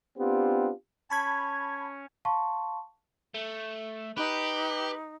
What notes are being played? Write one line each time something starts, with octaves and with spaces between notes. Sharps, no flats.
B3 C4 D4 F4 G4
C#4 C#5 A5 B5 G#6
F5 A5 C6 C#6
A3
D#4 G4 B4